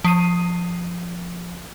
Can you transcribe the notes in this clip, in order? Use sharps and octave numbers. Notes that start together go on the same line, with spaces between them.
F3 C7 D#7